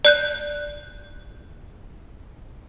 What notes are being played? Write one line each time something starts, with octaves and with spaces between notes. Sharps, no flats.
D5 F#6 G6